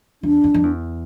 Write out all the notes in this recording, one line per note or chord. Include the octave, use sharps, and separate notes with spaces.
E2 D4
F2
F2
E2